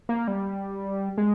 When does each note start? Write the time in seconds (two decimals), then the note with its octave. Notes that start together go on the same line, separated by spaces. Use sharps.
0.09 A#3
0.28 G3
1.18 G#3